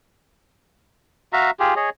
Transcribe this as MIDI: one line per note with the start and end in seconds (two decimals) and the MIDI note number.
1.33 1.51 66
1.33 1.51 76
1.33 1.51 77
1.33 1.51 82
1.60 1.74 65
1.60 1.74 67
1.60 1.74 68
1.76 1.90 68
1.76 1.90 73
1.76 1.90 75